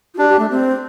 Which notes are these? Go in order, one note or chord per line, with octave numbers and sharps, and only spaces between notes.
F4
D4 G4
G4
A3
C4